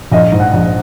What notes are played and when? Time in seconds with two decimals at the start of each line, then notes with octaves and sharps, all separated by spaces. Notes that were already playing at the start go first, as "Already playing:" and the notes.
0.12 A#1 D#5
0.32 G#2
0.40 F#5
0.53 A#1